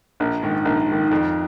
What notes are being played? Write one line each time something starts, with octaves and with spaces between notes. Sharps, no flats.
A#1
G#2 D#3
A#1
G#2 D#3
F2